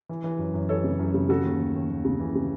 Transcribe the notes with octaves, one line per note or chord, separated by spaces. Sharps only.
E3
E3
F#2
F#2
E3 A4 C#5
C#3
F#2
C#3
C#3 F#4 A4
D#2
D#2
D#2
D#2
C#3
E3
C#3